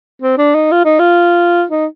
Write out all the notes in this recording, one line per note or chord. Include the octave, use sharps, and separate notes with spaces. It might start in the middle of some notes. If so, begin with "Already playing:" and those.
C4
D4
D#4
F4
D#4
F4
D#4